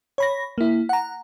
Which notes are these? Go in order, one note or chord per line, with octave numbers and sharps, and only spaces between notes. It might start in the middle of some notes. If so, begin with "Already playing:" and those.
C#5 B5 A#6
A#3 E4
F#5 A#5